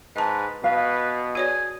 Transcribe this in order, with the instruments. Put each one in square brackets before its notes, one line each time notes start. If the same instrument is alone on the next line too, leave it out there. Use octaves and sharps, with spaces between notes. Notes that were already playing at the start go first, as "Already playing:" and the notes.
[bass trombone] G#2 [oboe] B4 [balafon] D#5 A5
[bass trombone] B2 [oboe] B4 [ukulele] F5
[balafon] F#4 C#5 D5 [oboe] G#4